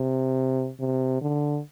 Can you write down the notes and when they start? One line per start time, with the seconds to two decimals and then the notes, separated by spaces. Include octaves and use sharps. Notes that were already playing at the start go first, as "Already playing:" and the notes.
Already playing: C3
0.80 C3
1.21 D3